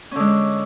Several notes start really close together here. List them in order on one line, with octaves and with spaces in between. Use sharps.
C#4 D3 G#3